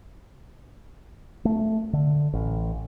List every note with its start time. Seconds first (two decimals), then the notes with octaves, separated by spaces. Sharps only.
1.45 A3
1.93 D3
2.33 A1